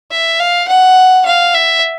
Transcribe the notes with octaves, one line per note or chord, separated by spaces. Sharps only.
E5
F5
F#5
F5
E5